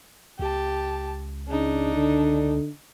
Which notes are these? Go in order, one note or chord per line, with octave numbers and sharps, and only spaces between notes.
C#2 G4 A5
C#3 D4 D#4
D3